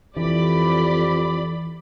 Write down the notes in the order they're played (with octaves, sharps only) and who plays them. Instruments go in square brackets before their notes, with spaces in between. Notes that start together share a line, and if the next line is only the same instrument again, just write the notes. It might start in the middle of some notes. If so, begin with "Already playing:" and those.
[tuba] F2 [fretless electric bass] E3 [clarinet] G4 [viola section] D5 B5